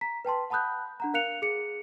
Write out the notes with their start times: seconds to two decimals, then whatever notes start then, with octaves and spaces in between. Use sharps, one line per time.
0.01 A#5 B6
0.25 B4 G5 A5 C6
0.50 F#5 A5 B5 D#6 F#6 G6
1.00 D4 F#5 A#5
1.14 A#4 F5 F#6 C#7 F7
1.42 G#4 C#7